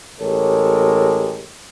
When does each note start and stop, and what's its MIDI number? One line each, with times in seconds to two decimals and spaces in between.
0.21 1.46 33
0.21 1.46 56
0.21 1.46 67
0.21 1.46 69
0.21 1.46 70
0.21 1.46 73